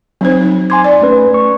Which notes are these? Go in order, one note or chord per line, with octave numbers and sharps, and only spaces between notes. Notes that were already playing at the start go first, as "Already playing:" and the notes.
F#3 C4 D#4 C5
D#4
G#5 C6 D6 G#6
D5
A3 C#4 B4
C#6